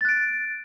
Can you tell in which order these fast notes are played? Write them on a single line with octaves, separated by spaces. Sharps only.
A6 F#6 D7